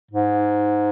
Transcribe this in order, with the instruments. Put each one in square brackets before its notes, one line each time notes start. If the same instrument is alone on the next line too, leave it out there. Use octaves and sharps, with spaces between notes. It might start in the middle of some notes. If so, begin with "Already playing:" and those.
[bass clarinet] G#2